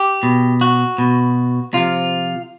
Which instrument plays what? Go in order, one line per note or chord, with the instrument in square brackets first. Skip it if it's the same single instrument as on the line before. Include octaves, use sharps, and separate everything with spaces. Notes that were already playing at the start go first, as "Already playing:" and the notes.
Already playing: [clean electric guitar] G4
B2
F#4
B2
C3 F3 F4